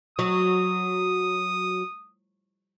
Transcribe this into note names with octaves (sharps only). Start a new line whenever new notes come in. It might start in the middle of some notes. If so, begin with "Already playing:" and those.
F#3 D#6